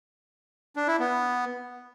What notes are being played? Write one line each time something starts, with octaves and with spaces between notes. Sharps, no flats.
D4
E4
B3